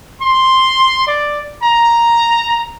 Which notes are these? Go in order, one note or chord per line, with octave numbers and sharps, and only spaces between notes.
C6
D5
A#5